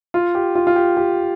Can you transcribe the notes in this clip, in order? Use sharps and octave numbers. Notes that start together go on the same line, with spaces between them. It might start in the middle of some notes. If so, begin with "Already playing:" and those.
F4
G4
F4
F4
G4
G4